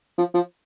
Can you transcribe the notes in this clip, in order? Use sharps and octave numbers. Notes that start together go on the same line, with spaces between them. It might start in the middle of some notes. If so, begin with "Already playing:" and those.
F3
F3